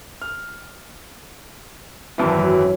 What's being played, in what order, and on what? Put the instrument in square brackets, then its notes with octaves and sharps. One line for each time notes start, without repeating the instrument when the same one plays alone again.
[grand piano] F6
[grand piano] G#1 F#2 E3 [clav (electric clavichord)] E4 A5
[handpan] F#3